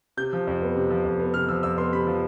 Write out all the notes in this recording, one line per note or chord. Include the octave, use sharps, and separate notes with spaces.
C3 G6
F3
F2
B3
C3
F3
F2
B3
C3 F6
F3 E6
F2 E6
B3 C6
C3 B5
F3